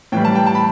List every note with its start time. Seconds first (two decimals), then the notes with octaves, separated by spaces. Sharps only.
0.12 A2 E3 G3 G5
0.25 A5
0.35 G5
0.47 A5
0.55 B5